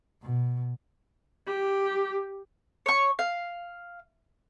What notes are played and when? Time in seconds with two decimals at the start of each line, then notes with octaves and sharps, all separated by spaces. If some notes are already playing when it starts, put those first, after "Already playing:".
0.22 B2
1.47 G4
2.86 C#5 C#6
3.19 F5